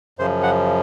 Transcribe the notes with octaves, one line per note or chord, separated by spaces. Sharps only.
F#2 C#3 F3 C5
F#5